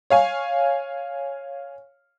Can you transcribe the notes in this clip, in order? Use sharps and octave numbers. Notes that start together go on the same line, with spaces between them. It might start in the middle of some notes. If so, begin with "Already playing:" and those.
C#5 F5 G#5